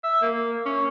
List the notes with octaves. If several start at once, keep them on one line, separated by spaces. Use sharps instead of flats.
E5
A#3
C#4